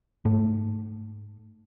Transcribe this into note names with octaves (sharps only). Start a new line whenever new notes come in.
G#2 A3